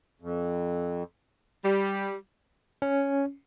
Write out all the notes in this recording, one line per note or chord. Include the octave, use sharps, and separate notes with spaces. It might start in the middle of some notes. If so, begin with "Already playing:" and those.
F2
G3
C#4